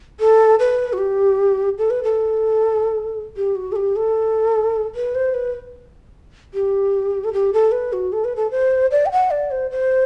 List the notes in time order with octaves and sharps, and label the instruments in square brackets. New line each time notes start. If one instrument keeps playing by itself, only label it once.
[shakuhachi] A4
B4
F#4
G4
A4
B4
A4
G4
F#4
A4
G4
A4
B4
C5
B4
G4
A4
G4
A4
B4
F#4
A4
B4
A4
C5
D5
G5
F#5
D5
C5
C5